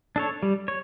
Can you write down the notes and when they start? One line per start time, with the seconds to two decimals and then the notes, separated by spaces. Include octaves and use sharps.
0.16 D4 A4 C#5
0.43 G3
0.68 C#5